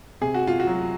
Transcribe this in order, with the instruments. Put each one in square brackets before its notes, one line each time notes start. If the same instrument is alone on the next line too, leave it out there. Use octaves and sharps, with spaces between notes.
[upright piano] C3 G#4
F#4
F4
F#4
F#3